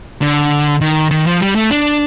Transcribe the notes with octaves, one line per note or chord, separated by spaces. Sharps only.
D3
D#3
D#3
F3
G3
A3
D4